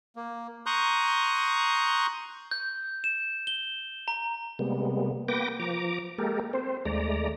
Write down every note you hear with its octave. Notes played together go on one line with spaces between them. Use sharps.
A#3
A#5 C6 C#6 D#6 F#6 G6
G6
E7
G7
A#5
C3 G3 G#3 A#3 B3
A#3 B3 B4 G5 D6 A#6
F3 A#5 D6
G#3 A#3 G4 A4 A#4
C4 C5
D#2 G#3 A3 D5 A#5